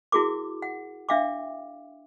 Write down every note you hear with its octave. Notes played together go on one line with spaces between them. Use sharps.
E4 F#4 G#4 A#4 D6
F#5
D4 E5 F5 G5 D6